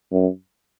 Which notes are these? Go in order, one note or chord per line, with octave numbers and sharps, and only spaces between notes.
F#2